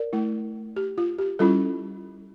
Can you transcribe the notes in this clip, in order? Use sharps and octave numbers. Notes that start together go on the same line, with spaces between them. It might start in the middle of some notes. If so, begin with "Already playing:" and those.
Already playing: A#4 D5
A3 E4
G4
F4
G4
G3 C#4 E4 F4 A4